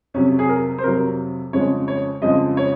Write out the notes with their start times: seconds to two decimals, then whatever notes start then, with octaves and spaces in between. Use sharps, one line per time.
0.14 F2 C3 F#3 C#4
0.39 G#4
0.49 A#4
0.78 C5
0.84 F2 C3 F#3 A#4
1.53 F2 C#3 F3 G#3 C#5
1.88 C#5
2.22 F2 C#3 F3 G#3 D#5
2.57 C#5